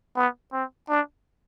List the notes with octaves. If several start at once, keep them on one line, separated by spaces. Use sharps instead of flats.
B3
C4
D4